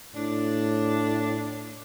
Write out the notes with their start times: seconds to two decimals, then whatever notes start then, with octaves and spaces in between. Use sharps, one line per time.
0.15 A2 D4